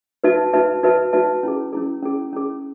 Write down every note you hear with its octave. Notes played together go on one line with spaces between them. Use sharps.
D#4 F#4 B4 E5 A5
D#4 F#4 B4 E5 A5
D#4 F#4 B4 E5 A5
D#4 F#4 B4 E5 A5
C#4 E4 G#4
C#4 E4 G#4
C#4 E4 G#4
C#4 E4 G#4